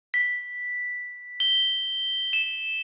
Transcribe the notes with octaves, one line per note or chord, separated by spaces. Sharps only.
B6
G7
E7